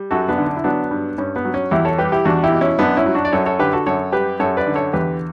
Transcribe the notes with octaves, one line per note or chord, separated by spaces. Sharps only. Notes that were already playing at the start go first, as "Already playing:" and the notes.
Already playing: G3
F#2 F#4 A4
B3 D4
D3
D4
E4
F#3 B3 D4
G2
G2 C#4
B3
F#3
C#4
E2 E4 G4
A4 C#5
G3 G4 B4
E4 G4
E2 D4 F#4
E4 G4
B2
C#4 E4
F#2 B3 D4
C#4 E4
F#3
D4 F#4
D5
F#2 A4 C#5
A4 C#5
D3 G4 B4
F#4 A4
F#2 A4 C#5
G3 G4 B4
F#2 A4 C#5
B4 D5
D3
A4 C#5
E2 G4 B4